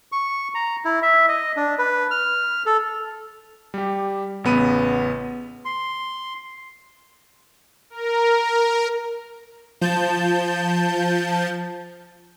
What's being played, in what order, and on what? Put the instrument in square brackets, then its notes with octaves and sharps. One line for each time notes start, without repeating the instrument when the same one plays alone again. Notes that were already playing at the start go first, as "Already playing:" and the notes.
[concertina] C#6
A#5
E4
E5
D#5
D4
B4
F6
A4
[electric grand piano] G3 G4
A1 C#3 B3 B5 D#7
[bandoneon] C6
[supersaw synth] A#4
F3 A5 G6